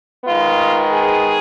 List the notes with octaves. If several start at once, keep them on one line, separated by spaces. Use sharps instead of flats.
D#3 G#3 B3 F4
G#4